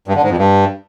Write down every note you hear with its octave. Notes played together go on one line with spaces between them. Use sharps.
G2
D3
G#2
F2
G2